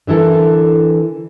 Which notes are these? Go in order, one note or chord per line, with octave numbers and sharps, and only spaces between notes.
D3 E3 E4 A4 A#4